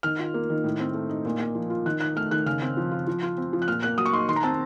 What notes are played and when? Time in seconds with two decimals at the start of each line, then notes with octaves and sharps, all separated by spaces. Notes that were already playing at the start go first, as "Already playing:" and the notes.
0.03 D#3 F6
0.19 F4
0.34 A#3
0.50 D#3
0.64 A2
0.80 C4
0.94 A3
1.09 D#4
1.25 A#2
1.40 A#3
1.55 F3
1.70 F4
1.86 D#3 F#6
2.01 D#4 F#6
2.16 A3 F6
2.31 D#3 F#6
2.46 C#3 F6
2.62 C4
2.77 F3
2.91 F4
3.07 F3
3.23 F4
3.38 C4
3.53 F3
3.62 F#6
3.68 A#2 F6
3.83 A#3 F#6
3.98 F#3 D#6
4.06 C#6
4.13 D#4 C6
4.29 D#3 C6
4.36 A#5
4.43 C4 A5